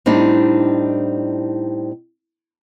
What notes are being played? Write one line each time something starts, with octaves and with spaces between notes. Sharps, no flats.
A2 G3 C4 D4 D#4